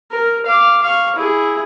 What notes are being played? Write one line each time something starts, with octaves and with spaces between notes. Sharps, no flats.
A#4
F5 D6
F5 C#6
E4 G#4